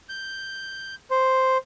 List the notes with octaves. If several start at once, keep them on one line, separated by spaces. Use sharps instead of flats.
G6
C5